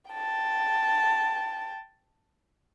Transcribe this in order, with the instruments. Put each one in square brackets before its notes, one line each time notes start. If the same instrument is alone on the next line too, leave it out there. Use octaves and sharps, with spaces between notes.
[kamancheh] G5 A5